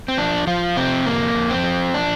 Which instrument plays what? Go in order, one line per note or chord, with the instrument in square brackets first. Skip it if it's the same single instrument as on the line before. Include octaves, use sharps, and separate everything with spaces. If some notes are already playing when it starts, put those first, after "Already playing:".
[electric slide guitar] C4
F3 D4
F3 F4
C3 C4
F2 A#3
F2
C4
F3
D4